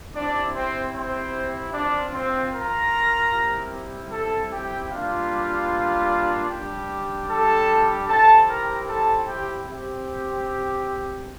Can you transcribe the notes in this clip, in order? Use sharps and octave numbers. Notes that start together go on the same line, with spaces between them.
C4 D4 E4 G4 D5
C4 C5
C4 C5
C4 D4 F4 D5
C4 C5
A#4 A#5
G3 C4 E4 G4
A4 A5
G4 G5
G3 A#3 D4 F4 G4 F5
G3 D4 G4
A4 A5
C4 E4 G4 A4 A5
A#4 A#5
A4 A5
G4 G5
C4 G4